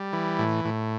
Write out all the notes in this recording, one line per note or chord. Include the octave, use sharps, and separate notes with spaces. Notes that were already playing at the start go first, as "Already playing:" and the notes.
Already playing: G3
E3
A2
A2